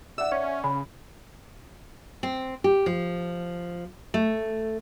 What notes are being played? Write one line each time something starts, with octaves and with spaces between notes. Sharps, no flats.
D5 E5 F#5 E6
C#4
C#3 B5
C4
G4
F3
A3